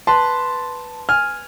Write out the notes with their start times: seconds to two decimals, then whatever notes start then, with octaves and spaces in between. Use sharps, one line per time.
0.07 B4 A5 C6
1.09 G#5 F6